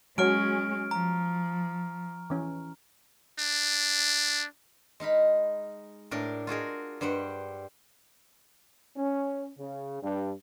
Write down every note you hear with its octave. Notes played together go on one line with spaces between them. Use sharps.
F#3 G#3 C#4 F#4 C#5 C#6 F6 D7
F3 A#5
E3 C#4
D4
G#3 D#4 F5 B5
A2 D4 A#4
F4 F#4 G#4 A#4
G2 G3 C5 F#5
C#4
C#3
G2